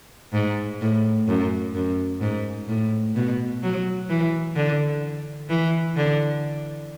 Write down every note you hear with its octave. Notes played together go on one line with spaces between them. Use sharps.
G#2
A2
F#2
F#2
G#2
A2
B2
F#3
E3
D3
E3
D3